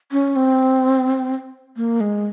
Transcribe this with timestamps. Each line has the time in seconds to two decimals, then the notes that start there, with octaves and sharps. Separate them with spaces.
0.12 C#4
0.36 C4
1.76 A#3
2.01 G#3